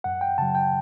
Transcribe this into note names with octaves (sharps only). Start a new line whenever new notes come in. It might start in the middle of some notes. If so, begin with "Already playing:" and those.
F#2 F#5
G5
C#3 F#3 A5
G5